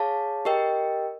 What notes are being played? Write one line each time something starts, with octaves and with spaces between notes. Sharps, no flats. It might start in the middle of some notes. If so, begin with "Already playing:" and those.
Already playing: G#4 C#5 F5 A5
G4 A#4 D#5 G5